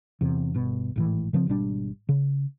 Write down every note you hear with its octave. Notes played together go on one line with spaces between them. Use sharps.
E2 C3
G1 B2
G#1 A2 E3
C#3 F3 A#3 C4
G#1 B2 G3 D4
C#3